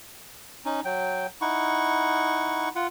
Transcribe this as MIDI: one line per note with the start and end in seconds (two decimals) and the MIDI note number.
0.65 0.81 61
0.65 0.81 63
0.85 1.27 54
0.85 1.27 79
1.41 2.69 63
1.41 2.69 64
1.41 2.69 78
1.41 2.69 85
2.75 2.87 65
2.75 2.87 78